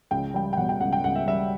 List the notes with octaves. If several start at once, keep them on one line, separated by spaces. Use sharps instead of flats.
C#2 G5
G3 G5
G5
B2 F#5
G5
C#2 F#5
G5
C#2 F#5
E5
G3 E5